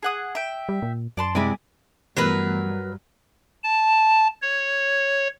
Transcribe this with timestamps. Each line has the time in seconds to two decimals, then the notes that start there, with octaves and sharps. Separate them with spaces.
0.03 G#4 F#5 D#6
0.35 E5 G5
0.69 G3
0.82 A#2
1.17 F#2 D5 A5 C6
1.35 C3 G#3 E4 D5 G#5 B5
2.17 G2 E3 F#3 A3 B3 A#4 B4
3.64 A5
4.42 C#5